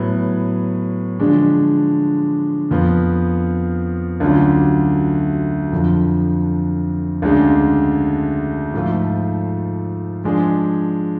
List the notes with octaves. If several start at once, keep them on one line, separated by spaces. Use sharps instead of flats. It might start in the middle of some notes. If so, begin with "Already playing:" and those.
Already playing: A2 F#3 B3 F#4
D3 F3 G#3 D4
F2 F3 B3
D2 D3 F#3 C#4 F4
F2 D3 F3
D2 C#3 G#3 D4
G#2 F3 A3 F4
F3 G#3 D4 G#4